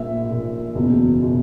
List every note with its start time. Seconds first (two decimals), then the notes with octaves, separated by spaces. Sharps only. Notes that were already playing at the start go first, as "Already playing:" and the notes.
Already playing: A#1 A#2 E5
0.29 A#1 A#2
0.75 F#1 E2 B2
1.23 B2